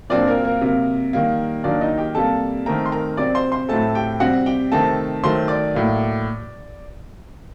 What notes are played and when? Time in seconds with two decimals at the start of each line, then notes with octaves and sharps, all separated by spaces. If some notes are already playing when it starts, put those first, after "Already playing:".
0.10 A#2 F#3 C4 D4 D5
0.27 A#3 A#4
0.44 A#3 A#4
0.61 C3 F#3 A#3
1.13 D#3 G3 A#3
1.64 D#3 F#3 A#3 D4 D5
1.81 D#4 D#5
1.98 G4 G5
2.15 C3 G3 A#3 A4 A5
2.66 D#3 A3 C4 A#4 A#5
2.86 C6
2.92 A#4 A#5
3.17 C3 F#3 C4 D5 D6
3.35 C5 C6
3.52 C5 C6
3.69 A2 F#3 A3 C4 A4 A5
3.95 G4 G5
4.20 C3 G3 C4 F#4 F#5
4.46 G4 G5
4.72 C3 D#3 A3 C4 A4 A5
5.23 D#3 F#3 A3 C5 C6
5.48 D5 D6
5.74 A2 F#3 A#3